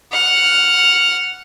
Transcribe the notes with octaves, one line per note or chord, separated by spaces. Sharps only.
F#5 F6